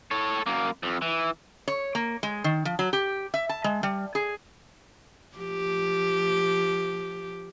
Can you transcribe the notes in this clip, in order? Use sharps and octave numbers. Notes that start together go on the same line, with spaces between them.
A4 C#5
F#2 A#3
F2
E3
C#5
A#3
G#3
D#3
F3
F#3
G4
E5
A5
G#3
G3
G#4
F3 G4